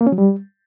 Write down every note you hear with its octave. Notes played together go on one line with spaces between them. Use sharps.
A#3
C#4
F#3
G3